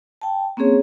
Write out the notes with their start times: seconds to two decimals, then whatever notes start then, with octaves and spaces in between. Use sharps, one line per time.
0.21 G5 A5
0.57 A#3 C4 C#4 G#4 C#5